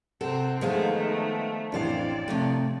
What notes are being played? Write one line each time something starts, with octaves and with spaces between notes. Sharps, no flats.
C3 C4 F#4 A4
D#3 F3 G#3 A3 B3 C5 F5
A1 F2 E3 D4 C5 D5 F5
C3 F3 A3